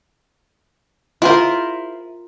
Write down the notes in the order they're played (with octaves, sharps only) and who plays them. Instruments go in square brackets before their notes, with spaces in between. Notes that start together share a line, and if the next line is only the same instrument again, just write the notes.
[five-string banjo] E4 G#4 C5 [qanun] F4 A#4